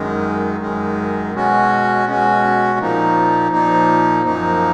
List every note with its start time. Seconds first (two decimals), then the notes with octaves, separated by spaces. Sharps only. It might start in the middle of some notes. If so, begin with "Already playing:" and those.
Already playing: F#2 D#3 G#3
0.60 F#2 D#3 G#3
1.33 B2 G#3 C#4 F#4
2.05 B2 G#3 C#4 F#4
2.79 A#2 F3 A#3 D#4
3.50 A#2 F3 A#3 D#4
4.24 F#2 F3 A#3 D#4